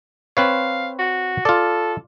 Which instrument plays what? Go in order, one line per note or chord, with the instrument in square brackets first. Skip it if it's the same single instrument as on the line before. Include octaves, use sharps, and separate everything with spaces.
[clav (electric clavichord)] C4 B4 C#5 [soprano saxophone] F5
[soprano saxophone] F#4
[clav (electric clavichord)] F4 D5 [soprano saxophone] A4